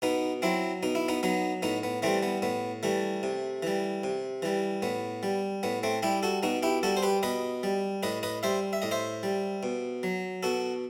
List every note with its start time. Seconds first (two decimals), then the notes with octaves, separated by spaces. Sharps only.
0.02 B2 B3 D#4
0.42 F#3 C4 E4
0.83 B2 D#4
0.95 E4
1.08 B3 D#4
1.23 F#3 B3 D#4
1.62 A2 B3 D#4
1.83 B3
2.02 E3 G3 A3 C4
2.23 B3
2.42 A2 B3
2.83 E3 G3 A3
3.23 C3
3.63 E3 G3
4.04 C3
4.42 E3 G3
4.82 A2 B3
5.23 G3
5.63 A2 B3
5.83 A3 C4
6.03 G3 E4 G4
6.23 F#4 A4
6.43 B2 D#4 F#4
6.63 E4 G4
6.83 G3 F#4 A4
6.97 C5
7.03 G4 B4
7.23 B2 B4 D#5
7.63 G3
8.03 A2 B4 D#5
8.23 B4 D#5
8.43 G3 C5 E5
8.73 E5
8.82 A2 D#5
8.91 C5 E5
9.23 G3
9.63 B2
10.03 F#3
10.43 B2 F#4 A4